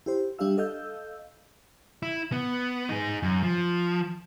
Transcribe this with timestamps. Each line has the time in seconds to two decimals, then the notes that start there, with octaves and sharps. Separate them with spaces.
0.06 E4 G4 C5
0.39 G3 D4 G4 E5 F5 E6
0.58 A4 D#5 F5 E6 G6
2.03 E4
2.32 B3
2.89 D#4 G#4
3.23 F#2
3.43 F3